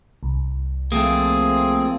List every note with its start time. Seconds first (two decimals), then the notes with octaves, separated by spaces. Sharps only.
0.23 C2
0.92 F3 A3 A#3 C4 G#4